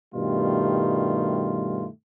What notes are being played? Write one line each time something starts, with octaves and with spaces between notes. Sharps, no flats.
G2 B2 D#3 G3 A3 F4